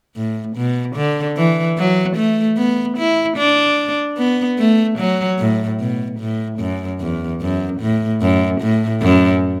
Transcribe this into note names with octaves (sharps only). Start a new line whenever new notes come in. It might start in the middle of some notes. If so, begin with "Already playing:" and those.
A2
B2
D3
E3
F#3
A3
B3
E4
D4
B3
A3
F#3
A2
B2
A2
F#2
E2
F#2
A2
F#2
A2
F#2